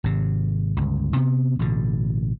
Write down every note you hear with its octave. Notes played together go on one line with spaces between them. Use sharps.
G#1 C3
G1 C#2
C3 B3
A1 B2 D3